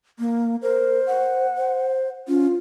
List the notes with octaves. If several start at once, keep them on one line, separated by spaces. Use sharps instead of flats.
A#3
A#4 C5
F#5
C5
C#4 F4